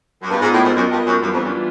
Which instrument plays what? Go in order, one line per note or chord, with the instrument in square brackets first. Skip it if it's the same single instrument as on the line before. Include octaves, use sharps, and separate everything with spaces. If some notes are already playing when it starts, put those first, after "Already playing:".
[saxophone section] F#2
[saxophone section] G2 [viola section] B3 D4 F4 A#4 D#5
[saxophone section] G#2
A2
G#2
F#2
G2
F#2
[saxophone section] F#2 [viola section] E3 G3 B3 D4 F4
[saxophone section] F2
F#2